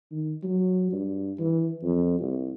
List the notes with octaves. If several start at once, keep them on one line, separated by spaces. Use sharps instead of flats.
D#3
F#3
G2
E3
F2
C2